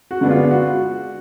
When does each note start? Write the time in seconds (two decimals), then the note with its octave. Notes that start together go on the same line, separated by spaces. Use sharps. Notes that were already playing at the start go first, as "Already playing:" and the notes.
0.11 F#4
0.21 D3 G#3 B3 D4
0.31 F4
0.51 F#4